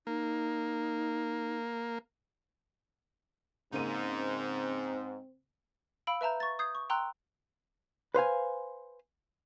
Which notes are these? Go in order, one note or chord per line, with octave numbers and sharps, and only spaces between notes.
A#3 D#4
G#2 C#3 A#3 C4 D#4 D#7
F5 B5 E6 D7
B4 E5 A5 A#5 G6
C#6 A6
D#6 G6 G#6 C7
C#6
G5 A#5 C6 E6 F#6
B4 C5 F5 G#5